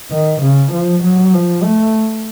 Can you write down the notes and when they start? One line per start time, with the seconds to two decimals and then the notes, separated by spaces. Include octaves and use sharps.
0.11 D#3
0.42 C#3
0.72 F3
1.03 F#3
1.33 F3
1.63 A3